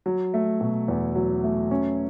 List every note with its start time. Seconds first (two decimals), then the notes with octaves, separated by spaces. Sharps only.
0.06 F#3
0.34 A3
0.61 B2
0.88 E2
1.15 F#3
1.44 A3
1.71 C#4